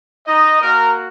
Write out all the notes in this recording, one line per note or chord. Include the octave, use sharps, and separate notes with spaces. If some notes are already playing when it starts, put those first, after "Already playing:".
D#4 D#5
A#3 F#4 A#4